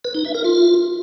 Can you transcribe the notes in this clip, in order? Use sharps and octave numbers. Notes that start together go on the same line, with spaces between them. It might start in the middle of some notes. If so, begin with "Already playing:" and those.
B4
D#4
E5
A#4
F4